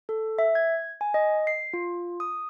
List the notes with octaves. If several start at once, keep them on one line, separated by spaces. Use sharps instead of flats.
A4
E5
G#6
G#5
D#5
C7
F4
D#6